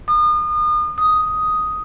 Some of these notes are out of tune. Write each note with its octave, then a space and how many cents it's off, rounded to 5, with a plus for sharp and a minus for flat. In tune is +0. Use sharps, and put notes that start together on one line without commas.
D#6 -35
D#6 +5